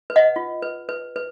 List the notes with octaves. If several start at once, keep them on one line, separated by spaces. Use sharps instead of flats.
B4
D#5 F#5
F4
B4
B4
B4